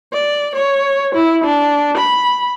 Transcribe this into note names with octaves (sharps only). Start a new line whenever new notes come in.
D5
C#5
E4
D4
B5